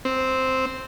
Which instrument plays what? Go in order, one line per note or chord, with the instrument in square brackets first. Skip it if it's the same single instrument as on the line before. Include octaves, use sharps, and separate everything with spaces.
[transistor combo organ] C4